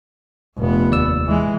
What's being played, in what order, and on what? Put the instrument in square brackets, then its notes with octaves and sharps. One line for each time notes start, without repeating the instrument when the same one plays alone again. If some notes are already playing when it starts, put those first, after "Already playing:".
[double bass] F1 B3
[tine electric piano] D#2 D5 E6
[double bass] E3 G#3